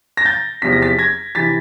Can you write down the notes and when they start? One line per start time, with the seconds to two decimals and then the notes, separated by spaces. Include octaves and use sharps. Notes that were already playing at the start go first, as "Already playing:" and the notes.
0.17 A#6
0.25 G6 A6
0.62 E2 C3 F3 B6
0.72 A#6
0.82 A6 B6
0.98 G#6 A#6
1.35 C3 E3 A6 B6